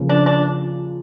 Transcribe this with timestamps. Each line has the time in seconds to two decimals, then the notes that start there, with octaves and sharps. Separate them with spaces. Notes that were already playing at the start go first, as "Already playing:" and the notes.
Already playing: C#3 F3 A#3
0.09 D4
0.26 D4